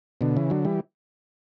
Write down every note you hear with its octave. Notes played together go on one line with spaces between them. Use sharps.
B2 D3
C#3 E3
D3 F#3
E3 G3